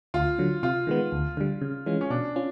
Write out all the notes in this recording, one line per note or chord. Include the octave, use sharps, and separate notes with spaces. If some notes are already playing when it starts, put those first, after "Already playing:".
D2 F4
D3 F#3
C3 F4
D#3 G#3 B3
D2
D3 G3
C#3
E3 G#3 C#4 F4
C#4
B2 D4
C#4 F4